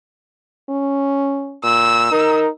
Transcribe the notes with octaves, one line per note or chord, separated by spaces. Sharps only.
C#4
A#2 E6
D#4 A#4